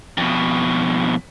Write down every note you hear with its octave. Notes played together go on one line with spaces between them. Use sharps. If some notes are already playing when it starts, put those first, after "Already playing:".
F2 B2